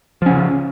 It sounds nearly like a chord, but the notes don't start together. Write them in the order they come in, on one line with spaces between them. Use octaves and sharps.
F3 C#4 C#3